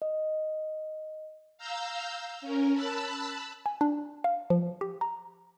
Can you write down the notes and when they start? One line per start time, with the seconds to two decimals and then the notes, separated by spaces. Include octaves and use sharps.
0.02 D#5
1.58 F5 A#5 E6 G6
2.41 C#4 A#4
2.73 A5 B5 E6 F#6
3.66 G#5
3.81 D4
4.24 F5
4.50 F3
4.81 G4
5.01 A#5